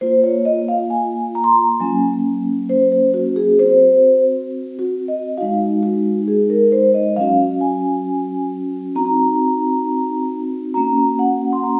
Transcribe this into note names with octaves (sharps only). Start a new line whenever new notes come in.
A#3 F4 C5
C#5
D#5
F5
G#5
A#5
C6
A#5
F#3 A#3 C#4 G#5
C5
C5
F#4
G#4
C4 F#4 C5
F#4
D#5
G#3 D#4 F#4 F5
F#4
G#4
A#4
C5
D#5
F#3 C#4 F#4 F5
G#5
C4 D#4 F#4 A#5
A#3 C#4 F#4 A#5
F#5
C6
A#5